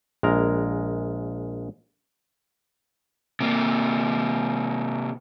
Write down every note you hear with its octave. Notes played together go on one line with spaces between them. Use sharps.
A#1 G#3 A#4 A#5
C3 A#3